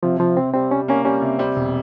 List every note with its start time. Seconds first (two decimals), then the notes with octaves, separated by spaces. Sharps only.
0.03 C3 F3
0.20 C3 F3
0.37 C3 C4
0.54 G3 C4
0.71 G3 C#4
0.88 A#3 C#4
1.05 G3 C#4
1.22 C3
1.39 G3 C4
1.56 E1